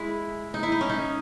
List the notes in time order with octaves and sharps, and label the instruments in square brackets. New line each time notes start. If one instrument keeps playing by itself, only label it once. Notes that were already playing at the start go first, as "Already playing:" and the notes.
Already playing: [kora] G#3 E4
D#4
E4
D#4
C#4
D#4